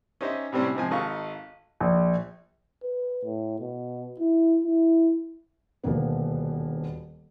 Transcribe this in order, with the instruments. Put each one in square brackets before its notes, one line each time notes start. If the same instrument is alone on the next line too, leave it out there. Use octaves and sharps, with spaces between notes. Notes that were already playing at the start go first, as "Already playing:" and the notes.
[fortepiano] C#4 D#4 G4 C5 D#5 E5
A2 C3 G3 C4 C#4
G#2 C3 F3 G#5
G#1 D#4 F4 A4 F5 C#6
[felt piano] A#1
[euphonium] B4
A2
B2
E4
E4
[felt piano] D#1 D2 B2 A#3 B3